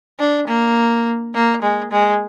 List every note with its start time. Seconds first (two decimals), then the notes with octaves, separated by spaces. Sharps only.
0.19 D4
0.47 A#3
1.34 A#3
1.62 G#3
1.91 G#3